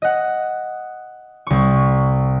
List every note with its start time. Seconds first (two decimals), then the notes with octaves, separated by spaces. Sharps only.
0.02 D#5 F#5
1.47 C2 C#6